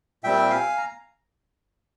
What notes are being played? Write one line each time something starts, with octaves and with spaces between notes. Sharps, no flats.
A#2 G3 C4 E5 G5
F5 G#5
A#5